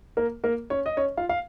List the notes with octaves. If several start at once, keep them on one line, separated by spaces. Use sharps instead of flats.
A#3 A#4
A#3 A#4
C#4 C#5
D#5
C#4 C#5
F4 F5
F5